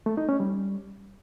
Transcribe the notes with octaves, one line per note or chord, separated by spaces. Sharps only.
A3
D#4
C#4
G3